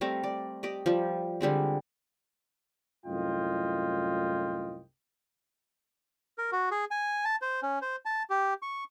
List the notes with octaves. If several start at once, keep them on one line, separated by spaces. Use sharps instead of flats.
G3 A3 C4 A#4
D5
G4 D5 D#5
F3 G3
D3 G3 G#3 C4
C2 F#2 A2 F4 D#5 G5
A#4
F#4
G#4
G#5
A5
C5
C#4
C5
A5
G4
C#6